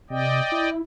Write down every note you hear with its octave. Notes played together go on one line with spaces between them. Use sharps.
C3 D5 D#5 G5
E4